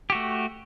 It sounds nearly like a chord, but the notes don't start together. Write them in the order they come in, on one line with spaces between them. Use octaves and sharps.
G4 F#4 A3